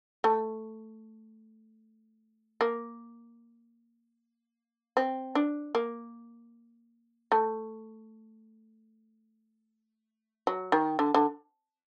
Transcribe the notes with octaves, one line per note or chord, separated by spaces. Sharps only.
A3
A#3
C4
D4
A#3
A3
F#3
D#3
D3
D3